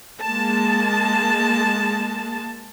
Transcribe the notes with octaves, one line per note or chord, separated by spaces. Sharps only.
G#3 A#3 A5